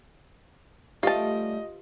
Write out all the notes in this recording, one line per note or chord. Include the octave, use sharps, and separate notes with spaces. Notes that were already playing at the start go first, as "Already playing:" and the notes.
G3 A3 C#4 F4 G4 B4 D#5 A5